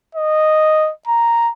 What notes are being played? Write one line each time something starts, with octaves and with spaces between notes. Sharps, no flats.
D#5
A#5